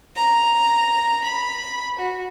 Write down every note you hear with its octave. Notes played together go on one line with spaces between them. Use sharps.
A#5
B5
F#4